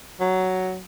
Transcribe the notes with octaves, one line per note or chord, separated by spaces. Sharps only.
F#3